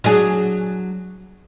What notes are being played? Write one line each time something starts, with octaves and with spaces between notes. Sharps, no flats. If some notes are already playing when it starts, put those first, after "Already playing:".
F#3 D4 G#4